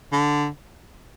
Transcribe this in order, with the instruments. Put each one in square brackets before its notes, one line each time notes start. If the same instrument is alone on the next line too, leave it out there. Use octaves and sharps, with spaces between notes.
[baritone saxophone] D3